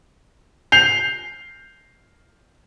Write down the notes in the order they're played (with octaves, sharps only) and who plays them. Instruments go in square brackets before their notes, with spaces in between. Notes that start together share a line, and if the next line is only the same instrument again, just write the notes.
[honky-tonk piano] G6 C7 F7